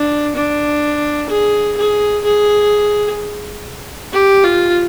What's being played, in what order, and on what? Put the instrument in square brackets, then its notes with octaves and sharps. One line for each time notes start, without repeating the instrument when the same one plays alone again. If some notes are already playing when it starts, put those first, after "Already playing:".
Already playing: [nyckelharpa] D4
D4
G#4
G#4
G#4
G4
F4